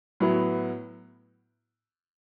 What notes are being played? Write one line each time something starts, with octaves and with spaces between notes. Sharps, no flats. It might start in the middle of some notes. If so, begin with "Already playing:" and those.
A2 F#3 B3 E4